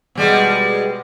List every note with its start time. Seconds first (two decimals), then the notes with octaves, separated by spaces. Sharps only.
0.15 B2 G3 G#3